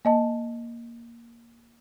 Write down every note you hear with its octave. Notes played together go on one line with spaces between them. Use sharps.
A#3 D#5 A5